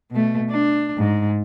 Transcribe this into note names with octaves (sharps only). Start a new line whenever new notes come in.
B2 A3
D4
G#2